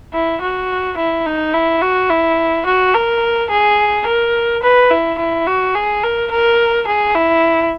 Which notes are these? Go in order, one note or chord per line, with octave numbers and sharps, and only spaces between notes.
E4
F#4
E4
D#4
E4
F#4
E4
F#4
A#4
G#4
A#4
B4
E4
E4
F#4
G#4
A#4
A#4
G#4
E4